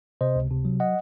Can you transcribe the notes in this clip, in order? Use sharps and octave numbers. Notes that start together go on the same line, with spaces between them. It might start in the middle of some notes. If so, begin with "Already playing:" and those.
C3 C5 D#5
C#2
C3
F#3
D#5 F#5